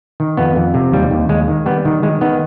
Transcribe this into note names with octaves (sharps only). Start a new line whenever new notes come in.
D#3
F2 B3
F2
C3
D#2 G3
D#2
D#2 G#3
D#3
G3 B3
D#3
D#3 G#3
D#3 B3